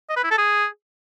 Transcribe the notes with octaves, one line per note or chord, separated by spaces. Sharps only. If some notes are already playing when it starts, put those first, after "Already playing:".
D#5
B4
E4
A4
G#4